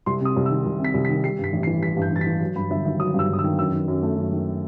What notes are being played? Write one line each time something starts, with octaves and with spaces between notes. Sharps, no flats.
C2 C6
C3 D#6
C2
E6
D#3
C2
C3
B6
C2
B6
D#3
G3 C7
G2 B6
A1
C7
E3
G3 B6
G2 G6
A1 A6
B6
E3
F#3
G2 B5
G1 E5
D#3 E5
F#3 D#6
G2 E6
G1 D#6
E6
D#3
F#2 E6
D#3
F#2
A3
F#2
D#3